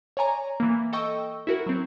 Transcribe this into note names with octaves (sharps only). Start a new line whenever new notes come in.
C#5 D5 G#5 A#5
E3 A#3
A4 D#5 G5 C#6 E6
E4 F#4 A#4
F#3 C4